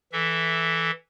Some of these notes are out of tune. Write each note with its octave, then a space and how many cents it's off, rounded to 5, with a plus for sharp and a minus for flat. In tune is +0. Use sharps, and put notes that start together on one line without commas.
E3 +0 A4 +0 E5 -5